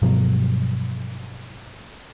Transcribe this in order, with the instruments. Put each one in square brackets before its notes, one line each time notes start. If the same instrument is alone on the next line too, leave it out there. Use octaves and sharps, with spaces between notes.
[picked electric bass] G2 B2 F3 F#3